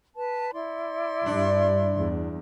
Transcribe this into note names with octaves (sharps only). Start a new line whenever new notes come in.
B4 A5
E4 D5 C6
G2 D4
E2